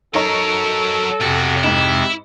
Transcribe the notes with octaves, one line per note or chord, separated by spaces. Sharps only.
F#3 D#4 A4 A#4 C#5 A#5
B1 F2 C3 C4 F#4 A6
G#2 D#4 E4